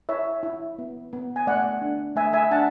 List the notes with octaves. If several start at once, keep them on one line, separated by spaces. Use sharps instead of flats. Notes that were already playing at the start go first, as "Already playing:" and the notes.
E4 C#5 E5
E4
B3
B3
G#5
A3 D5 F#5
D4
A3 E5 G#5
E5 G#5
D4 F#5 A5